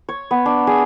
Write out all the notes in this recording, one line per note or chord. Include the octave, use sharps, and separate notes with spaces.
C#5
B3
D4
G#4